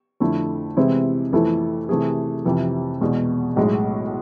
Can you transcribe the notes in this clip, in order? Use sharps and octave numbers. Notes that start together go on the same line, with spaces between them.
F2 D3 A3 E4
C3 E3 G#3 C4 E4
F2 E3 A3 E4 A4
C3 E3 A3 E4 G#4
F2 C3 E3
E2 B2 G#3
B1 A2 G#3